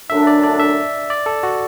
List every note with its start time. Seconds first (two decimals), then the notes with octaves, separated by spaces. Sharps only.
0.10 F#2 D3 A3 D4 E5
0.27 D5
0.44 D5
0.60 E5
1.10 D5
1.26 A4
1.43 F#4